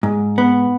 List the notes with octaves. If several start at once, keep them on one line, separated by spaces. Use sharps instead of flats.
G#2
B3